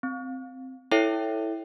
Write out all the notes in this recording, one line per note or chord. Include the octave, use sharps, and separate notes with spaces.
C4
E4 A4 C#5 E5 G5 C7